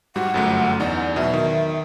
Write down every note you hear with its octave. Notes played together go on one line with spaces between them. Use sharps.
G#2 G3 F#4 F#5
G1 F#2 A3
E2 D#4 D5
B2 F#3 E5
D#3